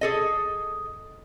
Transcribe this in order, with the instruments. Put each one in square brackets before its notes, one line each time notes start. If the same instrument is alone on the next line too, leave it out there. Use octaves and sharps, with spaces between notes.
[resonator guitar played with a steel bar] G#4 A4 D#5